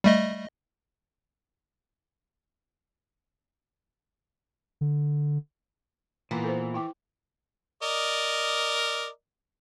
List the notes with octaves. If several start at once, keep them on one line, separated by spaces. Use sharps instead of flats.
G3 A3 D#5
D3
A#2 E3 B3
A4 B4 C5
E4 G5 D6
A#4 D5 D#5